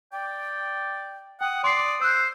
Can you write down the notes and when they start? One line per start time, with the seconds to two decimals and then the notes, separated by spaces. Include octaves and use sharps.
0.13 D5 G5
1.41 F#5 G5 D#6
1.64 D5 C6 C7
2.01 C5 E6 F#6